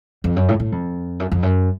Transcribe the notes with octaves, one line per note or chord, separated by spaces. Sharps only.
F2
F#2
A2
A2
F2
F#2
F2
F#2